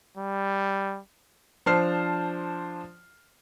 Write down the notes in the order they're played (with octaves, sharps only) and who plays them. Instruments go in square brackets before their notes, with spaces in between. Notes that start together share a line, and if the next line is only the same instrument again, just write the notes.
[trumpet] G3
[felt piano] F3 D4 C5 A5 F6 C7